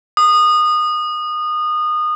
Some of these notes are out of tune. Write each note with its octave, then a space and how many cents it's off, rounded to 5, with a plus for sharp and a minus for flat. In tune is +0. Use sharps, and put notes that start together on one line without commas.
D#6 -25